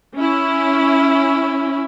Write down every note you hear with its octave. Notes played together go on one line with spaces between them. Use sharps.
C#4 E4